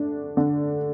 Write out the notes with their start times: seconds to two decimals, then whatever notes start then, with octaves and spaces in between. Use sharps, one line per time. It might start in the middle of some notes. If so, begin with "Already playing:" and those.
Already playing: D3 A3 D4
0.37 D3